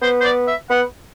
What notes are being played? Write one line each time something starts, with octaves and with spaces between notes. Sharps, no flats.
B3 C5
C5
D5
E5
B3 F#5